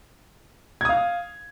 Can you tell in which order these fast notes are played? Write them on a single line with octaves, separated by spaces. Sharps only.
G#6 D#6 F5